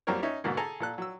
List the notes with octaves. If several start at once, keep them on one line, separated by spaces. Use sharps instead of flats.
F#2 G3 A#3 C4 A#4 C#5
C#4 D#4 E5
G#2 B2 D3 A#3
G#4 A4 G#5 A#5
A#2 A4 F#6
F#3 E6